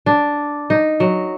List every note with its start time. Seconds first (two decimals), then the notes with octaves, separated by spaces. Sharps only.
0.06 D4
0.70 D#4
1.00 F#3